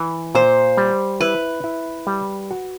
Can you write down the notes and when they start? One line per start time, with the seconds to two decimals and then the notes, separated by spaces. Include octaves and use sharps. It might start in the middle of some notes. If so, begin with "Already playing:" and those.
Already playing: E3
0.35 A#2 C5
0.77 G3
1.21 E4 B4
1.64 E4
2.07 G3
2.51 F#4